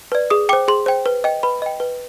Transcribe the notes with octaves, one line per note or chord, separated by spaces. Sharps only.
B4 D5
G#4 D#6
C5 G5 D6
G#4 C6
C5 G5
B4
D#5 G5
B4 B5
D#5 G5
B4